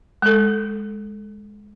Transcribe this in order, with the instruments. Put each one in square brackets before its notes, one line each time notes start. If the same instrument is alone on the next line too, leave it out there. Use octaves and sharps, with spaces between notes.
[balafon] G#3 A4